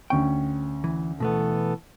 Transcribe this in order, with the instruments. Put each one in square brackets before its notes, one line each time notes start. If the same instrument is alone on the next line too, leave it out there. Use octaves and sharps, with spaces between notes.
[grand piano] D2 C#4 C#6 [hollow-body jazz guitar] G5
[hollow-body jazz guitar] E3
[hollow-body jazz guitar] B2 A3 B3 [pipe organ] E3 A4